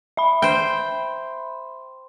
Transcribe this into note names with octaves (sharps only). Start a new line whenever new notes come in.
E5 B5
C5 G5